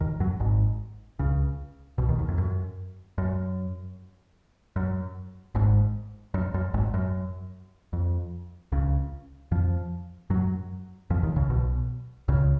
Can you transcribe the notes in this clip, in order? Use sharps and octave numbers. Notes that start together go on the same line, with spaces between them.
D#2 D#3
F#2 F#3
G#1 G#2
C#2 C#3
B1 B2
D#2 D#3
D#2 D#3
F2
F#2
F#2
F#2
G#1 G#2
F#2
F#2
G#1 G#2
F#2
F2
C#2 C#3
F2 F3
F#2 F#3
F2 F3
D#2 D#3
C#2 C#3
B1 B2
C#2 C#3